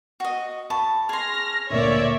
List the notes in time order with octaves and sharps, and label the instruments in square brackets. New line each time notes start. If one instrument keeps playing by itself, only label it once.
[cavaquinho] F#4 D#5
[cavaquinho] A5 [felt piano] B5 C#6
[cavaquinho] G#4 C6 [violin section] F6 A#6
[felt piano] D2 A#2 A#3 [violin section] C#5 D5 E5